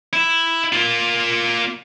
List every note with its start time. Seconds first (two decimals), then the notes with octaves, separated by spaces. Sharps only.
0.13 E4
0.72 A#3 F4